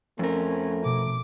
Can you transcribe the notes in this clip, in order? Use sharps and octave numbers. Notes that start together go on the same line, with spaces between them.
F2 A3 C4 C#4 A#4
B2 D6